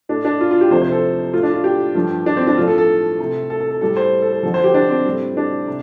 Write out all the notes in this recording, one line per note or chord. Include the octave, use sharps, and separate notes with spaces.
A2 A3 D4
D4
F4
F4
G4
F2 C3 A3 C5
C5
A4
A2 A3 F4
D4
F4
G4
G2 F3 A3
D4
C4
D4
A2 F3 A3 F4
A4
A4
C3 A3
A4
A4
A4
A2 G3 A4
C5
A4
A4
F2 D3 F3 A4
C5
G4
D4
C4
A2 G3
D4
C3